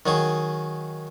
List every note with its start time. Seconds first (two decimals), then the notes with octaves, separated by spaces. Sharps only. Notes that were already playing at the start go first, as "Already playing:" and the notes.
0.06 D#3 F#3 G#4